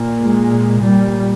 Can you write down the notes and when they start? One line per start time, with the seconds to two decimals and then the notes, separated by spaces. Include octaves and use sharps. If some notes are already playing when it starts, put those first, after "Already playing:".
Already playing: A#2
0.22 G#3
0.84 A#2 G3